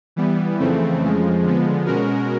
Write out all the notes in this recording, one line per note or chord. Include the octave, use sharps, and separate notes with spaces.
E3 G3 B3
F2 C#3 E3 A3 C4
F2 C#3 F3 G#3
D3 F3 G#3 B3
B2 G#3 C#4 F#4 A#4